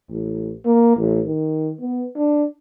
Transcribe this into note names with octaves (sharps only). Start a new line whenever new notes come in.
A1
A#3
A1
D#3
B3
D4